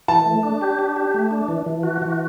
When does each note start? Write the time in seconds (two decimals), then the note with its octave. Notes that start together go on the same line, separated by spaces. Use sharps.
0.08 E3 A5
0.26 A3
0.43 D4
0.61 G4
0.79 D4
0.96 G4
1.14 A3
1.31 D4
1.48 E3
1.66 E3
1.83 F#4
2.02 E3